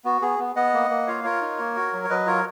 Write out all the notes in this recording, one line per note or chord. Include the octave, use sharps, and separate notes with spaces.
B3 F#4
B3 G#4
B3
B3 D#5 F#5
A#3
A#3
F4 C#5 F5
F4 A#4 C#5
D#4
A#3
F#4
F#3
C#5
F#3 B4 D#5
F4 A#4 C#5